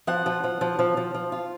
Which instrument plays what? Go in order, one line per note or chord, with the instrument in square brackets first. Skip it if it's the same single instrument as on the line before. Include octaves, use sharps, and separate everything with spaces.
[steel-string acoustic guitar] F3 F#5
F3
F3
F3
F3
F3
F3
F4